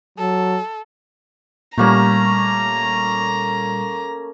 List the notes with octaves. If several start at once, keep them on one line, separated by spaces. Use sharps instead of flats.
F#3 A4
A#2 G3 A3 A#3 C#4 A#5